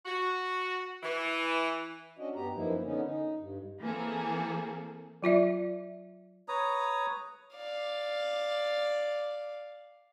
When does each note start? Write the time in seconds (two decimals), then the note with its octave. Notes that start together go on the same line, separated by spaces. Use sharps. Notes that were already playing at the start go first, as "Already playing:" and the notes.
0.05 F#4
1.03 E3
2.19 C#4 D4 F#4 D#5
2.35 G2 B3 G4 A#5
2.55 F#2 E3 F3 A#3 D#4 E4
2.84 D3 B3 C#4 D#4
3.04 D#4
3.39 G2
3.80 E3 A#3 C4 G#4 A4
5.23 F#3 F4 D5 E5
6.48 B4 C#5 A#5 D#6
7.56 D5 F5